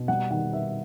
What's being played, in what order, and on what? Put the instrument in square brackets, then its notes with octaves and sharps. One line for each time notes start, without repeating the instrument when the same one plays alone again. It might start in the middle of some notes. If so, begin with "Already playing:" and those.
Already playing: [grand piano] B2
G3 F#5
D#3 F#5
B3 E5